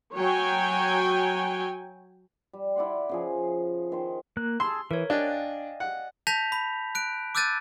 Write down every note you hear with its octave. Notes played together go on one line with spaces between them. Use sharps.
F#3 C#5 G5 G#5
G3
E4 D5 F#5 C6
C#3 F3 G#4
D#3 C5
A#3 F#6
G#4 A5 C6 E6
E3 A#4 C#5
D4 D5 D#5 F5 G5 G#5 F#6
F#5
A5 G6 A#6 B6 F7
B5
F#6 D7
D6 E6 F#6 G6 A6 D#7